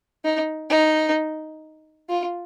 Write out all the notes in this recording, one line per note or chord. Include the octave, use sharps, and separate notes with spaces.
D#4
D#4
F4